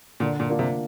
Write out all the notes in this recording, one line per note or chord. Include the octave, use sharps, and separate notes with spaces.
A#2 D3
A#2
A#3 D4 F4
C3